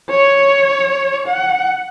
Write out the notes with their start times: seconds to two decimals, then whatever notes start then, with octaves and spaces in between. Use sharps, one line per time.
0.10 C#5
1.28 F#5